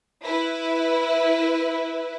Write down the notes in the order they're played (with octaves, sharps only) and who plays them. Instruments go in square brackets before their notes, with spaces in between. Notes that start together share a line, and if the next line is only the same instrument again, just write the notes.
[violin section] E4 B4